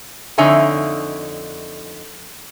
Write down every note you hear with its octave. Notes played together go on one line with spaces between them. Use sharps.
F2 D3 D#4 C#5 E5 G#5